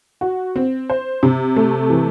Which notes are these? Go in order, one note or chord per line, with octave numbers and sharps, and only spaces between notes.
F#4
C4
C5
C3
A3
E3